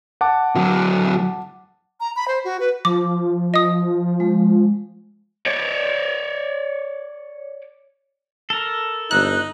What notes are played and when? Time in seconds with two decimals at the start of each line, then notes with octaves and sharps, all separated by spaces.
0.21 F#5 A5 D6
0.55 D2 F#3
2.00 A#5
2.16 B5
2.28 C5
2.44 F#4
2.60 B4
2.85 F3 D6
3.54 D#5 D#6
4.20 G#3
5.46 C#5 D5
8.50 A4 A#4
9.11 G1 D#4 F#6